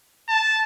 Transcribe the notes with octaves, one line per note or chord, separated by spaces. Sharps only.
A5